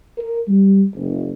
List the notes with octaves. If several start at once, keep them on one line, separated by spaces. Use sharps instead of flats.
A#4
G3
F#1